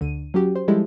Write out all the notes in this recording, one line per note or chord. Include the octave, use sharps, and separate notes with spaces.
D2 D3 D#7
F#3 C#4 F#4 G4
C5
F3 G3 G#3 E4 G4 A4